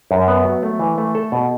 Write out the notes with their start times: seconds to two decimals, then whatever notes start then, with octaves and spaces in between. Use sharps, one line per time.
0.11 F#2
0.28 B3
0.45 F#3
0.63 A3
0.79 E3
0.98 A3
1.15 A4
1.32 B2